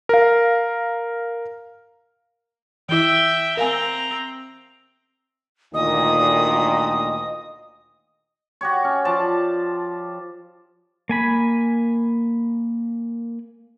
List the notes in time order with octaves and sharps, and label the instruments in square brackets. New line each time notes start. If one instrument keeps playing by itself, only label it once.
[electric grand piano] A#4 F5
[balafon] E3 E4 [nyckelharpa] E5 G5
[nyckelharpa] C4 A#5 [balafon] A#4 F5 G#5
[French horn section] D2 A#2 D#3 [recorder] D#5 [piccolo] D#6
[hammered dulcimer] F#4 G4 C#5
C#4
F3 D5 A5
[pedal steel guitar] A#3 G#5 B5